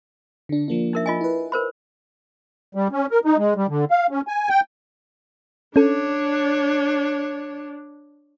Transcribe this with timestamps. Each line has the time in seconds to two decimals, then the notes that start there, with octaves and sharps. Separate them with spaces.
0.49 D3 D4
0.68 F3 A#3 D4
0.93 D#4 A#4 E5
1.06 F4 D#5 G#5
1.21 E4 B4
1.52 A#4 C5 B5
2.75 G3
2.92 C#4
3.11 A#4
3.25 D#4
3.38 G#3
3.56 G3
3.69 D3
3.90 F5
4.10 C#4
4.28 G#5
4.49 G5
5.76 C#4 D4 A4 C#5